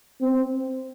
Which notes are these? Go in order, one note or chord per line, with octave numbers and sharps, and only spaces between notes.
C4